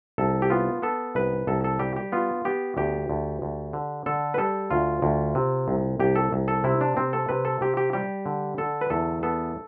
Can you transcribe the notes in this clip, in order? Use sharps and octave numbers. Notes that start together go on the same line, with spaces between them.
C2 A4
G4
B3 F4
B3 A4
C2 B4
C2 A4
A4
G3 G4
G4
B3 F4
B3 G4
D2 G4
D2
D2
D3
D3 A4
B4
G3 A4
D2 F4
D2
C3
C2
C2 G4
A4
C2
A4
C3 E4
D4
C3 C4
A4
C3 B4
A4
C3 G4
G4
G3 G4
D3
D3 A4
B4
E2 A4
B3 A4